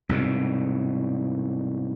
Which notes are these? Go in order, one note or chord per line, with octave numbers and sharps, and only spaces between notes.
C2 G#2 B2